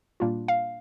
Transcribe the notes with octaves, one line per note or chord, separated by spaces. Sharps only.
A#2 G3 A#3 D4 F4
F5